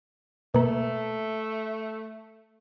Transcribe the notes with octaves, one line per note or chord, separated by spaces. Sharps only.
B2 A3 A#3